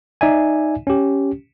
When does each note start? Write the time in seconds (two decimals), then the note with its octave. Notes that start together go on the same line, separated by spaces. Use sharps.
0.21 D#4 D5 E5 G#5
0.87 C#4 G4